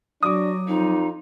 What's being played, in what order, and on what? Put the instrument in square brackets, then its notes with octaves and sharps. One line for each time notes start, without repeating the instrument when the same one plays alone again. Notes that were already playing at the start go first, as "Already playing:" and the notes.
[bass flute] F#3 [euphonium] D4 [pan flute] F#4 [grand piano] D6 D#6
[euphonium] F2 [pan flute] D#4